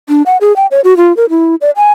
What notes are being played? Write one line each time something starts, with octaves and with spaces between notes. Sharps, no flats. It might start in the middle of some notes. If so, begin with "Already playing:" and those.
D4
F#5
G#4
G5
C#5
F#4
F4
A#4
E4
D5
G#5